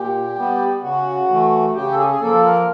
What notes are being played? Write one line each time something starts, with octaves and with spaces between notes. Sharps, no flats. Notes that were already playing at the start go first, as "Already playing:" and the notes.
Already playing: A#2 G4
G3 B3
C#3 F#4
E3 A3
C#3 G4
A4
G#4
G#4
F3 A#3 A4
A#4